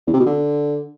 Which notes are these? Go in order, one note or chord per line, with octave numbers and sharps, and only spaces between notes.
E2
C3
B2
D3